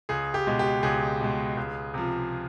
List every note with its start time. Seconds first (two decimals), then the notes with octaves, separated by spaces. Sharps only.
0.09 C#2 G#4
0.34 G4
0.47 B2 G#3
0.59 G4
0.83 C#2 G#4
1.21 B2 G#3
1.57 C#2
1.94 C3 F3